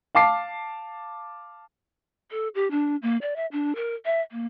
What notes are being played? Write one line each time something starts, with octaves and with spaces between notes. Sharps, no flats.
F5 A5 D6 C7
A4
G4
D4
A#3
D5
E5
D4
A#4
E5
A#3